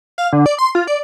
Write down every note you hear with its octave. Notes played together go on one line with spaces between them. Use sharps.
F5
D3
D5
C6
F4
D5